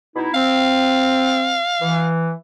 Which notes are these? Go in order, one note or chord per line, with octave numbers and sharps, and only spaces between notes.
B2 D#4 E4
C4 F5
E3